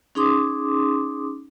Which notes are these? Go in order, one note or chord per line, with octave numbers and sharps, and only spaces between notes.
C#4 D#4 G#4 C6 D6 D#6